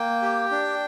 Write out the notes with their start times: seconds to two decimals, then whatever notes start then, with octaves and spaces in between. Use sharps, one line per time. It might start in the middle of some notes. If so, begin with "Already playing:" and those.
Already playing: A#3 G5
0.22 G4
0.52 D4